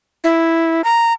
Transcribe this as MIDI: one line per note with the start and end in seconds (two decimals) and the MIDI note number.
0.24 0.82 64
0.84 1.13 82